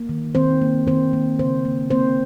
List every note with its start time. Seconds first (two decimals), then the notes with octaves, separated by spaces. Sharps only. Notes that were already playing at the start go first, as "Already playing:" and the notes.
Already playing: A#3
0.09 D#3
0.35 D#3 C4 C5
0.61 A#3
0.87 D#3 C4 C5
1.13 A#3
1.39 C#3 C4 C5
1.65 A#3
1.90 A#3 C4 C5